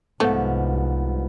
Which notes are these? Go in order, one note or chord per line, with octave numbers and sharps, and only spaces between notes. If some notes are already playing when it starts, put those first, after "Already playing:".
C2 G#2 F3 A3 B3